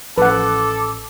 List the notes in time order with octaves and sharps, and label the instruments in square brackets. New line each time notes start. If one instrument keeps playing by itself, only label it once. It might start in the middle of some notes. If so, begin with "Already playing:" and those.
[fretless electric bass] A1 F3 [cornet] A4 [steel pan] B4 F#5 [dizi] D6